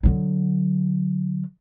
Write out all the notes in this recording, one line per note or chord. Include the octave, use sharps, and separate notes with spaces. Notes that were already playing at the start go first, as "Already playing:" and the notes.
D3 F#3